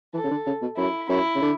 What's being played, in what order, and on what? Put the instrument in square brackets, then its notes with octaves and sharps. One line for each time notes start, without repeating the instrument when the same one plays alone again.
[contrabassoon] E3 [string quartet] A4
[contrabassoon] C#3
D3
C#3
B2
[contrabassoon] F#2 [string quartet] E4
[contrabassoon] F#2 [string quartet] E4
[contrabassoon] C#3
D3